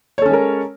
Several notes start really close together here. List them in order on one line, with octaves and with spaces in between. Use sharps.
C#5 A4 C#4 G#3 A#4